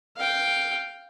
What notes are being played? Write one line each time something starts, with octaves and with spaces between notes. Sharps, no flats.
F5 G5